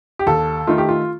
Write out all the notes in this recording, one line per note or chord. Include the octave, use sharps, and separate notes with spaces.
G4
D#2 A4
D#3 A3 F4
G4
F4